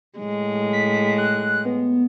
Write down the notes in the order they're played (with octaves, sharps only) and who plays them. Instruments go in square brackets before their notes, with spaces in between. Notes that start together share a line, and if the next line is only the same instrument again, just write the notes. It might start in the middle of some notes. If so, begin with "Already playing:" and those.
[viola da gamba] A2 G#3
[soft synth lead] B6
F#6
B3